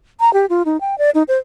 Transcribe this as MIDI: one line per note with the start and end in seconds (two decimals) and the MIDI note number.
0.20 0.33 82
0.34 0.46 67
0.50 0.63 65
0.65 0.80 63
0.81 0.98 79
0.98 1.10 74
1.15 1.23 63
1.28 1.38 72